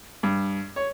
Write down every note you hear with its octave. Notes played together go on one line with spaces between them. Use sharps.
G2
C#5